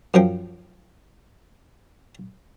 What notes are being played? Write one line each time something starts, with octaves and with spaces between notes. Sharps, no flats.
F#2 F3 G5